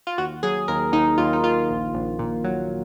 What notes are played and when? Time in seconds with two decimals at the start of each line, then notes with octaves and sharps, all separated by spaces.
0.07 F4
0.18 D#2 F#4
0.43 F#3 G#4
0.68 D#2 A#4
0.93 D#2 D#4
1.18 D#2 F4
1.33 D#4
1.43 D#3 F4
1.69 A#1
1.94 A#1
2.19 A#2
2.44 F#3